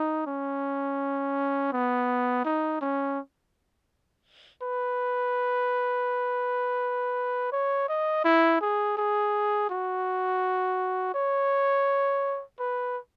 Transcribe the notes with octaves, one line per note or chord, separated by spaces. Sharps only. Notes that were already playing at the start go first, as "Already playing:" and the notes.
Already playing: D#4
C#4
B3
D#4
C#4
B4
C#5
D#5
E4
G#4
G#4
F#4
C#5
B4